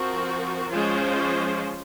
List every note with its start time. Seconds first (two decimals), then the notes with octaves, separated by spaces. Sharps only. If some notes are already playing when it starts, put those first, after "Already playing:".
Already playing: F3 C4 F#4 A#4
0.71 F3 G#3 C#4 F4 C5